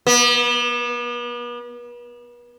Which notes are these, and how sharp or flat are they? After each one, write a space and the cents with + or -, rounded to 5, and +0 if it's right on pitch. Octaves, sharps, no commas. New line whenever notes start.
B3 -40